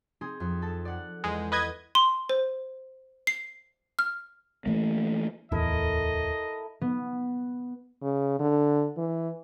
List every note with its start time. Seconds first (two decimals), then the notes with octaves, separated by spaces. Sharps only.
0.21 C4 D#4 G#4
0.40 F2
0.62 A4 A5
0.85 D5 F#5
1.24 E2 G#3
1.52 B4 D#5 G#6
1.95 C6
2.29 C5
3.27 C7
3.99 F6
4.66 E3 A3 A#3
5.52 D1 E2 E4 A4 A#4 D#5
6.81 B3
8.02 C#3
8.39 D3
8.97 E3